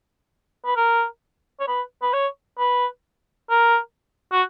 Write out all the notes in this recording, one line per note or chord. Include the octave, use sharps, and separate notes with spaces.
B4
A#4
C#5
B4
B4
C#5
B4
A#4
F#4